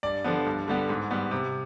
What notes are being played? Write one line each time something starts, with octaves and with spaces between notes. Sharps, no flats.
G2 D5
D3 F3 B3
G2
D3 G3 B3
G#2
G3 B3
C3